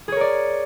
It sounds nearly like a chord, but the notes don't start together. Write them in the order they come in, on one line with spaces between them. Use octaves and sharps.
G#4 C#5 A#4 D5